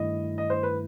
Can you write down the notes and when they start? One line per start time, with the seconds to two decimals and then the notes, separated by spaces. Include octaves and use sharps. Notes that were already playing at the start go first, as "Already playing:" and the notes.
Already playing: G2 D#3 A3 E4 D#5
0.38 D#5
0.50 C5
0.63 B4